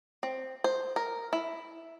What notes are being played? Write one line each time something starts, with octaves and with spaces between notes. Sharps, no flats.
C4
C5
A#4
E4